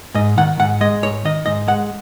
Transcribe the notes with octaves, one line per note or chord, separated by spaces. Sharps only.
G#2 D#5
D#3 F#5
G#2 F#5
G#3 D#5
G#2 C#5
D#3 D#5
G#2 D#5
G#3 F#5